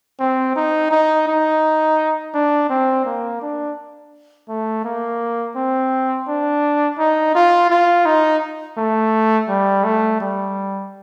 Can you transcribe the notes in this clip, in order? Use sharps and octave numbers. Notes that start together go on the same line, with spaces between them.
C4
D#4
D#4
D#4
D4
C4
A#3
D4
A3
A#3
C4
D4
D#4
F4
F4
D#4
A3
G3
A3
G3